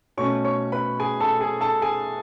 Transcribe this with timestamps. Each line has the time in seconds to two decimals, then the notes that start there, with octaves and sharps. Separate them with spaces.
0.17 B2 A3 C#4 C#5 C#6
0.44 C#5 C#6
0.72 B4 B5
0.99 G#4 G#5
1.21 A4 A5
1.41 G#4 G#5
1.61 A4 A5
1.82 G#4 G#5